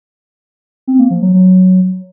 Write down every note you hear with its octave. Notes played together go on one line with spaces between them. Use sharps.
C4
A#3
F3
F#3
F#3